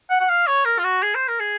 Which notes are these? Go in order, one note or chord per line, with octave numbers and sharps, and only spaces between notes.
F#5
F#5
F5
C#5
A#4
F4
F#4
G#4
C5
A#4
G#4